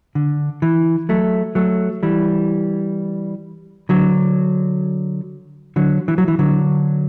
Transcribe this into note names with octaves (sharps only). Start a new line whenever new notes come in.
D3
E3
F#3 A3
F#3 A3
E3 G3
D3 F#3
D3 F#3
E3
F#3
E3
D3 F#3